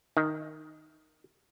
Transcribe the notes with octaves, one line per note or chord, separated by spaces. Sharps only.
D#3